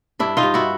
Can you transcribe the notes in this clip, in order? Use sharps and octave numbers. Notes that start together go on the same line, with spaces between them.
G2 D4 E4
D#4 F4
G2
E4 F#4